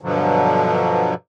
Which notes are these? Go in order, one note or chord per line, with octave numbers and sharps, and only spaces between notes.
G2 B2 D3 F3 F#3